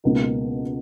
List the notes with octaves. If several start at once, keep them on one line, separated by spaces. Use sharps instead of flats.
C#2 B2 A#3 D#4